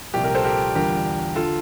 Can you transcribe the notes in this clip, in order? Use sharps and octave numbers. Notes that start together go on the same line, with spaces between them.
C2 A#2 F3 G4
G4 A#4
A4 C5
G4 A#4
E2 D3 G3 D4 F4 G4 A#4
D3 F4 A4